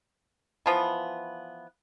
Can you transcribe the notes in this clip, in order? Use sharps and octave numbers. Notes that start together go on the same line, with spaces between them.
E3 F3 B3